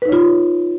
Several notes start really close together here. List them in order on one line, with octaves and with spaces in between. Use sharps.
B4 D#4 C#5 F4